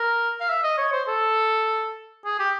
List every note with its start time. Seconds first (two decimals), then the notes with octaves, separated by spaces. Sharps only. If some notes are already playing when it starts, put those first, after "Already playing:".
Already playing: A#4
0.40 F5
0.49 E5
0.63 D#5
0.78 C#5
0.92 C5
1.08 A4
2.25 G#4
2.39 G4